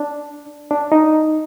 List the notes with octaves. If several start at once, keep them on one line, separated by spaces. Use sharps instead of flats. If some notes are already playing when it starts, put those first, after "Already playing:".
Already playing: D4
D4
D#4